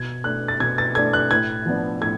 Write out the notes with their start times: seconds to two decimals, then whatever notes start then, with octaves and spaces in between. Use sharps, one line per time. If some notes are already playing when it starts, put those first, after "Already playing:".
Already playing: B2 G#6
0.24 A3 D4 F#6
0.48 A6
0.60 B2 G#6
0.78 A6
0.95 A3 D4 G#6
1.13 F#6
1.31 A2 G#6
1.66 F3 B3 D4
2.01 A2 G#6